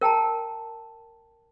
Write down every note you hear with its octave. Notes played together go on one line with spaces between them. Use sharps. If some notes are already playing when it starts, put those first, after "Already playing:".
A#4 G5 A5 A#5